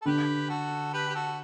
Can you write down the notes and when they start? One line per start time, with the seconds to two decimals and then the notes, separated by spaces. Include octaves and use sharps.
0.02 A4
0.06 D3 G4 B4
0.50 F#4 A4
0.93 G4 B4
1.09 G4
1.15 F#4 A4